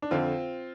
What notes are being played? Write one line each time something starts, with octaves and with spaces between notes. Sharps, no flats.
D4
F2 D3 C4 F4